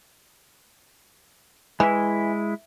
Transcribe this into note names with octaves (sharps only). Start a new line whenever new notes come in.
E3 G#3 E4